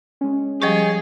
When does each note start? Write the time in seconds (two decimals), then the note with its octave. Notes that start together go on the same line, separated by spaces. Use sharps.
0.21 G#3 C#4
0.62 F3 G3 G4 G#4 C#5 D#5 G5